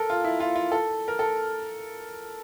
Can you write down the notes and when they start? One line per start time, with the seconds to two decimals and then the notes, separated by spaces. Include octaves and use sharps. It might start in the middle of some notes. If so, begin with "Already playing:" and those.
Already playing: A4 A#4
0.10 F4
0.24 E4
0.40 F4
0.56 F4
0.72 A4
1.08 A#4
1.19 A4